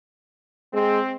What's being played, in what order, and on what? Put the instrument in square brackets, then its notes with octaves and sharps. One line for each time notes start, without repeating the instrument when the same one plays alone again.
[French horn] G#3 [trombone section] C4